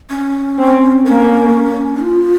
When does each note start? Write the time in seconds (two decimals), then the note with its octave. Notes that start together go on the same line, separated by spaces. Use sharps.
0.10 C#4
0.58 C4
1.06 A#3 C#4
2.03 F4